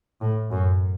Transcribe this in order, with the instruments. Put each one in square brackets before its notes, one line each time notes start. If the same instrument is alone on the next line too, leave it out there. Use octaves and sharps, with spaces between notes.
[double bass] A2
F#2